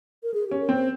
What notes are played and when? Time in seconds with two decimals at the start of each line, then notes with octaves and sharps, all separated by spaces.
0.23 A#4
0.34 G#4
0.47 C#4 G4
0.61 A#4
0.69 C4
0.74 C5